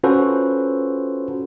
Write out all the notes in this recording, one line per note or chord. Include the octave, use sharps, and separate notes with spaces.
C#4 F4 F#4 A4 B4 C5